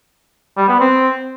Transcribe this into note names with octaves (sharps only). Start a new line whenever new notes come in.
G3
B3
C4